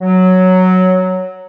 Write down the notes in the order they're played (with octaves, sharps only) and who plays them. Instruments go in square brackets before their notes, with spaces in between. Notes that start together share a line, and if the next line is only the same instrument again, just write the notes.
[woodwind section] F#3